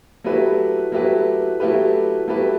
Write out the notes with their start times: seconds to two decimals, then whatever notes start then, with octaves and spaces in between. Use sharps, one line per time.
0.24 F#3 A3 E4 G4 B4
0.92 F#3 A3 E4 G4 B4
1.60 F#3 A3 E4 G4 B4
2.27 F#3 A3 E4 G4 B4